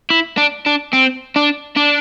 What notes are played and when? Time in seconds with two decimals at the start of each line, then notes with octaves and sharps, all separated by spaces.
0.10 E4
0.37 D4
0.66 D4
0.93 C4
1.36 D4
1.77 D4